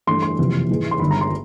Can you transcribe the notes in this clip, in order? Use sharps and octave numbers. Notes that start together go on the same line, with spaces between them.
G2 E3 A3 D4 C6
C6
F#1 F2 C3 E3
G#2 E3 G#3
C6
G1 G2 D#3 B5
A#5
C6